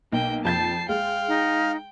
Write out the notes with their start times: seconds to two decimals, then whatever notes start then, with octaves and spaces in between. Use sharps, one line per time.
0.12 B1 A#3 G5
0.45 F2 A5 G6 A6 C7
0.89 G#3 F5 G5
1.27 D#4